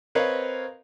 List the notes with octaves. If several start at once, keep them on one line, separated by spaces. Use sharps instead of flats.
C4 A#4 B4 C#5 D#5 F5